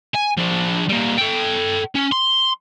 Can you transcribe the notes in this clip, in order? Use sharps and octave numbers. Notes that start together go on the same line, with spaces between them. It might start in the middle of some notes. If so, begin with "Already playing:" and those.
G#5
F3 D4
G3 A#3
A4 G5
C#4
C6